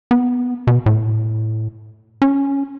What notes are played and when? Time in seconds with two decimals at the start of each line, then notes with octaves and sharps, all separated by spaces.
0.11 B3
0.67 B2
0.86 A2
2.22 C#4